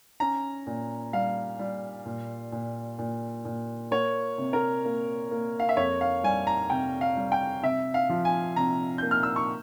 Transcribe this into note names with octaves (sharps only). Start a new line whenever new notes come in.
C#4 A#5
A#2
G3 F5
G3
A#2
A#2
A#2
A#2
A#3 C#5
C3
A#4
A#3
A#3
F5
E5
F2 C#5
F5
G3 G#5
A#5
C3 G5
F5
G3
G5
C3 E5
F5
F3
G#5
C3 A#5
A#3 G6
F6
E6
C#6